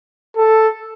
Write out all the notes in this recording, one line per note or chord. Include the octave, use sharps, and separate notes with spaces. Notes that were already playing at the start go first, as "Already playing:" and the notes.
A4